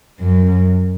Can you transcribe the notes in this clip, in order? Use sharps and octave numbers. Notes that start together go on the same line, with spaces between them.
F#2